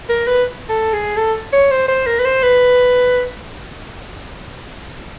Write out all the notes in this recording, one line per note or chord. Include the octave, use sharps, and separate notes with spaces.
A#4
B4
A4
G#4
A4
C#5
C5
C5
A#4
B4
C5
B4